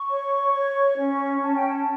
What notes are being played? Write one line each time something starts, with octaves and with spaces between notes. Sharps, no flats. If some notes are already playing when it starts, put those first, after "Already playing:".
Already playing: C#6
C#5
C#5
C#4
C#4 A5
G5
A5